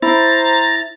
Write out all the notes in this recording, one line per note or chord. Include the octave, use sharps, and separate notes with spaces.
E4 C5 A#5 A6